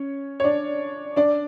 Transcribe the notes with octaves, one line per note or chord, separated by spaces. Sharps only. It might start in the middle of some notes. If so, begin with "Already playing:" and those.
Already playing: C#4 C#5
C#5
D4 D5
D4 D5